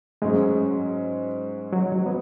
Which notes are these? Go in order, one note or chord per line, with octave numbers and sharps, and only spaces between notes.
G#2 F#3 G#3 C#4
F#3
F#3
B3